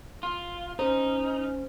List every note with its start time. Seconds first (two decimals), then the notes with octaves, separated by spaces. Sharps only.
0.23 F4
0.79 C#4 D#4 C5